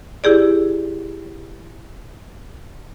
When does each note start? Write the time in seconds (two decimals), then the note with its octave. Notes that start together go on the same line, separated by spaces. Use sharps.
0.24 E4 G4 G#4 D5